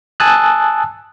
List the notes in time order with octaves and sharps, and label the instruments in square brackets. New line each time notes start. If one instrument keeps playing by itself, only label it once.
[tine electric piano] G#5 A5 D#6 E6 F#6